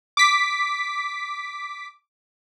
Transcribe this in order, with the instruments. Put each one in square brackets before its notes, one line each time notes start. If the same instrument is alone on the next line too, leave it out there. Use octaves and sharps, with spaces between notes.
[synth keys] D6 B6